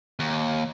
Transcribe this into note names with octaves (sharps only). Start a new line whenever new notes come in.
D#2